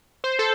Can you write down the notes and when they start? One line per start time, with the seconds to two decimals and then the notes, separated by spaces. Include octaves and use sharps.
0.24 C5
0.39 A4